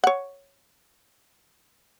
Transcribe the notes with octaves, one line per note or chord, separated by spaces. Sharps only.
C#5 F#5